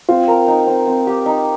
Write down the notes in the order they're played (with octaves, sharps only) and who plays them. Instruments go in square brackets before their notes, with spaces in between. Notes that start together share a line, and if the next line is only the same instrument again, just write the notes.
[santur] C4 [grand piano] F4
[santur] A#4
D#4
C4
C4
G4
D#4